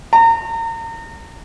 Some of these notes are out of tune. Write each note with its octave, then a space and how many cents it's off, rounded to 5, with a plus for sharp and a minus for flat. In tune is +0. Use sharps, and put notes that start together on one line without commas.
A#5 -35